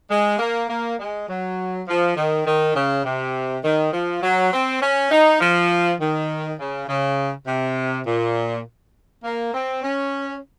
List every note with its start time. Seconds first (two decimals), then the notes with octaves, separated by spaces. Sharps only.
0.10 G#3
0.39 A#3
0.70 A#3
0.99 G#3
1.28 F#3
1.88 F3
2.16 D#3
2.46 D#3
2.75 C#3
3.05 C3
3.64 D#3
3.93 F3
4.23 F#3
4.53 C4
4.82 C#4
5.11 D#4
5.40 F3
6.00 D#3
6.60 C#3
6.88 C#3
7.47 C3
8.06 A#2
9.24 A#3
9.54 C4
9.83 C#4